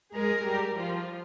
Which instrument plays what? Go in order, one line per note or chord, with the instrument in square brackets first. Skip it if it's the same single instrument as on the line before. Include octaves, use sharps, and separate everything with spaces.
[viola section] G#3 G#4 [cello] A#4
[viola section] G3 G4
F3 F4